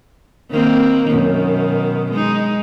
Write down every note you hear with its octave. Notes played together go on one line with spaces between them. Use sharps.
D#3 A#3 C4
F#2 B2 D#3
G#3 D#4